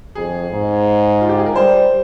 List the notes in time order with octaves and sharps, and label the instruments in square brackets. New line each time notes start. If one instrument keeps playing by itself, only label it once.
[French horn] F2 [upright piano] G#4
[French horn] G#2
[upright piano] F4
G4
G#4
A#4
[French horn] G3 [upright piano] C5